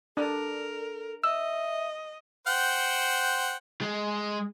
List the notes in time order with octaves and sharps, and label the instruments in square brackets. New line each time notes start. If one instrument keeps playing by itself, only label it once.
[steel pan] D4 [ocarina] A4 [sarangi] A#4
[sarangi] D#5 [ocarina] E5 [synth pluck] E6
[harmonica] C5 F#5 G5
[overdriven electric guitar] G#3